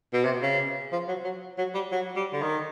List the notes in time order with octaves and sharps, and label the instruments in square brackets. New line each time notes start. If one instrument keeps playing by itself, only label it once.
[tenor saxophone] B2
C3
C#3
F3
F#3
F#3
F#3
G3
F#3
G3
D3
D#3